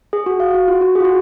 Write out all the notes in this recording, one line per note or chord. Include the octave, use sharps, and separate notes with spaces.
G#4
F#4
F5
F#4
F4
F#4
G#4
F4
F#4